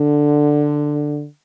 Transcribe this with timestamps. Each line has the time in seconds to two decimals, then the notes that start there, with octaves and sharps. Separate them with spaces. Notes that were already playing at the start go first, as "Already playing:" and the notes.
Already playing: D3